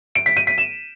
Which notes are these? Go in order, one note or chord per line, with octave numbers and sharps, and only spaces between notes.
D7
B6
D#7
B6
E7